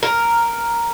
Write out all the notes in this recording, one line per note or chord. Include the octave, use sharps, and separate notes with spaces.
A#4